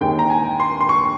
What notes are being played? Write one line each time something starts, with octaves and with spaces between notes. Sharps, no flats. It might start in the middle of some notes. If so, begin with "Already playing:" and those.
D#2 D#3 G#3 G5
A#5
G#5
C6
C6
C#6